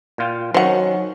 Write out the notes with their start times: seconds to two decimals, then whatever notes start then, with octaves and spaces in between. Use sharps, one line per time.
0.18 A#2 F4 G5
0.54 D#3 F#3 C#4 C5 F#5